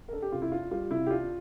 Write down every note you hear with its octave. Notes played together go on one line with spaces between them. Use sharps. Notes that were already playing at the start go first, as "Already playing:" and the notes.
A#4
D4 A4
G4
C3 F4
E4
D4 F4
G3 F4
C3 E4
G4
D4 F4